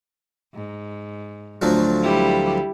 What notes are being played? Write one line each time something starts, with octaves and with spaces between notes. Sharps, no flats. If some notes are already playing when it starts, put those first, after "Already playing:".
G#2
D2 F3 F#3
G3 E4 G4